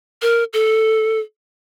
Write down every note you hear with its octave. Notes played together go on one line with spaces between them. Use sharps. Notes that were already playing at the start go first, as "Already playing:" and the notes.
A#4
A4